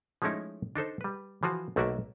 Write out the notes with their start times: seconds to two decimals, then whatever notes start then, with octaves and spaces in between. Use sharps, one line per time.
0.22 F3 G#3 A3 C#4 D#4 E4
0.76 D4 D#4 A4 C5
1.01 G3 B4
1.43 E3 F3 F4 F#4
1.76 B1 A3 A#3 F#4 D5 E5